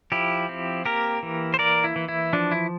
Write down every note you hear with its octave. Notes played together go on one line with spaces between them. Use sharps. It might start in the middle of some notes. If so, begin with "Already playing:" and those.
F3 E4 G4
C4
A#3 G4 A#4
E3
C5
A#3 A#4 D5
E4
E3
E4
F3 D4
E4